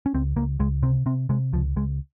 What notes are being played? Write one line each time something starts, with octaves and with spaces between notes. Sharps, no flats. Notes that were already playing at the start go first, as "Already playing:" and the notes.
C#4
C#2 C4
C#2 A#3
C#2 G#3
C3 C4
C3 C4
C3 G#3
C#2 F3
C#2 G#3